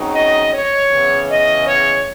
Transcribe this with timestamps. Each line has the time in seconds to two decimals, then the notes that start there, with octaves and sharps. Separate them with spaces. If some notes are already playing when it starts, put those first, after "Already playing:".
Already playing: C#3 F#3 C4 D#4
0.14 D#5
0.53 C#5
0.90 E2 C#3 E3
1.28 D#5
1.66 C#5